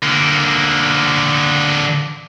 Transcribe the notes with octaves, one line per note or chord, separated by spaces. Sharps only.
D3 A#3